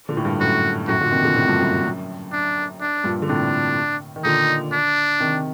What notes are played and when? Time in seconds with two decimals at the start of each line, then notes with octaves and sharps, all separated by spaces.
0.09 A#2 D3
0.17 A2
0.25 G2
0.40 F#2 A2 F#4
0.88 F#2 A2 F#4
1.01 A#2 D3
1.12 C3 D#3
1.24 A#2 D3
1.36 A2 C3
1.48 G2 A#2
1.61 F#2 A2
1.84 F#2
2.32 D4
2.81 D4
3.04 G2 A#2
3.22 D3
3.28 A2 C3 D4
4.16 D#3
4.24 A#2 D3 D#4
4.72 D4
5.20 C3 D#3